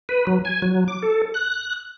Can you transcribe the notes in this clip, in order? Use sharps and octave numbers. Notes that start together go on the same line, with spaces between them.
B4
F#3
G#5
F#3
D6
A4
F#6